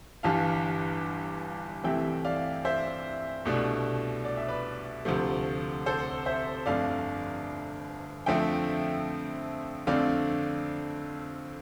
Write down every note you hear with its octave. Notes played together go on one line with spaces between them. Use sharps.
G1 G2 E3 F5 A5
C2 C3 E3 A3 C4 E5 G5
D5 F5
C5 E5
C2 B2 A3 D4
D5
E5
B4 D5
D2 C3 F3 A3
A4 C5
C5 E5
G1 F2 D3 A3 D5 F5
F2 D3 F3 A3 C4 E5 G5
F2 D3 A3 C4 D5 F5